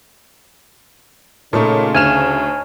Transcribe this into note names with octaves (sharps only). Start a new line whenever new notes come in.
A#2 C#3 A3 D#4 A4 C#5
D2 G#5 F6 E7